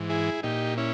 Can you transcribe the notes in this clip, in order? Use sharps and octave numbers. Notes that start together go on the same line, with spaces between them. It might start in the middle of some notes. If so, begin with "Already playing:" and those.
Already playing: G#2 E3
E4 G#4
A#2 D#4 G4
C#4 E4